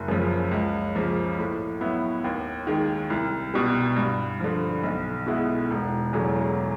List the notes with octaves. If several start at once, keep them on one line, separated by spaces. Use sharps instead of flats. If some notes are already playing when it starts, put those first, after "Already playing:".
Already playing: F#1
F#2 C#3 F3
C#2
C#3 F3 A#3
A2
F#3 B3 E4
D#2
D#3 G#3
C2
B2 G3
G2
D3 F3
B1
B2 G#3 B3 E4
E1
E2 C#3 F#3 A3